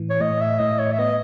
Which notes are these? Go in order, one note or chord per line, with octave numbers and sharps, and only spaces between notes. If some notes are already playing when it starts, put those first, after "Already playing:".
Already playing: A2 E3
C#5
A2 D#5
E5
A2 D#5
C#5
E5
B3 D#5